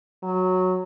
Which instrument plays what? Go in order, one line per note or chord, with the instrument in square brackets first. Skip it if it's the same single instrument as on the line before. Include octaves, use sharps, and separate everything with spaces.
[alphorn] F#3